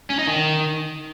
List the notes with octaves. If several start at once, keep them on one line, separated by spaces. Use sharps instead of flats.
C#4
D#4
D#3